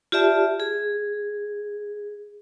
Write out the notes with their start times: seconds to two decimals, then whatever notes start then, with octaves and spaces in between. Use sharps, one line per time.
0.12 F4 G4 D5 E5 A5
0.60 G#4